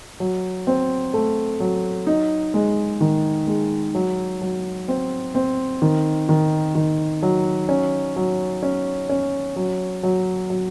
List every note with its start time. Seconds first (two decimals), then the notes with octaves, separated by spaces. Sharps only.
0.20 F#3
0.67 C4
1.14 A3
1.60 F#3
2.07 D#4
2.54 G#3
3.01 D#3
3.47 G#3
3.95 F#3
4.42 F#3
4.88 C4
5.35 C4
5.82 D#3
6.29 D#3
6.75 D#3
7.23 F#3
7.69 C#4
8.16 F#3
8.63 C#4
9.09 C#4
9.56 F#3
10.03 F#3
10.50 F#3